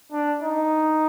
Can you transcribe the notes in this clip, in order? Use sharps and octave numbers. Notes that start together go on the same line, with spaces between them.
D4
D#4